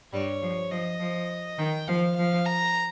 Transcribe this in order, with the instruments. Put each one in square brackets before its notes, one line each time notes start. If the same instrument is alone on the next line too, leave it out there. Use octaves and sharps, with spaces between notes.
[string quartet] G2 G3 [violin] C#5
[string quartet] F3
[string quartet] F3 [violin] D#5
[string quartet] F3
[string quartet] D#3 [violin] G5
[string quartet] F3 [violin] F5
[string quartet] F3 [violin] F5
[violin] A#5